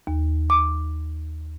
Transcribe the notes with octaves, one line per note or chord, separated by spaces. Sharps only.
D#2
D6